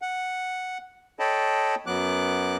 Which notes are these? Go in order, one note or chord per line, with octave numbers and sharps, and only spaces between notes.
F#5
A4 C#5 D#5 G5 A5 B5
F#2 F#3 B3 D6 F#6